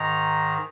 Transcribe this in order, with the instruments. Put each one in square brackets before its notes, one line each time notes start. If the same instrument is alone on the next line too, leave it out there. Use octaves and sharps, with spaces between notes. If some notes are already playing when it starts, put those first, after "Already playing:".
Already playing: [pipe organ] G#2 D#3 A#5